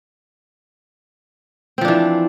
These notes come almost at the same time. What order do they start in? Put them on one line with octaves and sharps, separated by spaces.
C4 F3 D4 E3